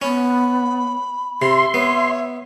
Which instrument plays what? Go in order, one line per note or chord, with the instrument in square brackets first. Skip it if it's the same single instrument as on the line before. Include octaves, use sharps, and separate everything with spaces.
[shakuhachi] B3 [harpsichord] C#4 [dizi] B5
[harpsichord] C3 [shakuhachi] E5 [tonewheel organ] C6
[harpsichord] B3 [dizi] C#5